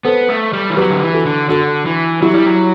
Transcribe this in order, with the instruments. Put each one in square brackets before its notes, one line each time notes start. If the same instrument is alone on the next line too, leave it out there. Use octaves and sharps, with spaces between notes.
[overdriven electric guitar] B3 [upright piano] A4 C5
[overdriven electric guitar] A3
G3
E3
[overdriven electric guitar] F#3 [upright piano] G4 B4
[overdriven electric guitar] D3
E3
[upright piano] F#4 A4
[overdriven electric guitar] D3
[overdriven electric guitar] D3 [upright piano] F#4 A4
[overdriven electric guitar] E3
[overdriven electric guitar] F#3 [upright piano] E4 G4
[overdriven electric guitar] G3
F#3